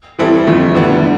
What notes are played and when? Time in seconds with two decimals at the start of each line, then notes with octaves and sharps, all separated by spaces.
0.19 E3 G3 C4 E4 A4
0.47 F2 D3 F3 A3
0.75 D3 G3 B3 E4
1.03 D3